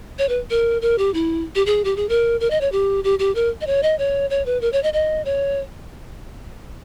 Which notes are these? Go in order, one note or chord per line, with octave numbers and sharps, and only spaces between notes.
C#5
B4
A#4
A#4
G4
E4
G4
G#4
G4
G#4
A#4
A#4
D#5
C#5
G4
G4
G4
A#4
D#5
C#5
D#5
C#5
C#5
B4
A#4
C#5
D#5
D#5
C#5